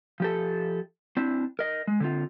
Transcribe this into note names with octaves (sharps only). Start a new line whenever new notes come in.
F3 G4 A4
C4 D4 E4
A#4 D#5
G#3
D3 C4 F4